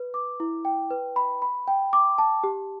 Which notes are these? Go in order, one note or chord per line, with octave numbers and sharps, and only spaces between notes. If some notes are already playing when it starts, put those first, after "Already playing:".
Already playing: B4
D6
E4
G5
B4
B5
B5
G5
D6
A5
G4